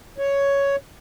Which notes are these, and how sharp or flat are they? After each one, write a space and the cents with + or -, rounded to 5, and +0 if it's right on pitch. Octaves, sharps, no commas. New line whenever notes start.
C#5 +5